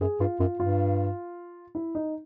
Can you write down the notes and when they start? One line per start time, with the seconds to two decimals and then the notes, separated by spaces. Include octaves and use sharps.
0.01 F#2 G#4
0.20 G2 F4
0.40 F#2 F4
0.59 G2 F4
1.75 E4
1.95 D#4